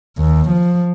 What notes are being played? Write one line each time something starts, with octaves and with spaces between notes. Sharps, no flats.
D#2
F3